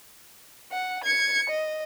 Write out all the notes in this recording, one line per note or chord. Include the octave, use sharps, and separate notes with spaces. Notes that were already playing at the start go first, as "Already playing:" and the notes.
F#5
G#6 C#7
D#5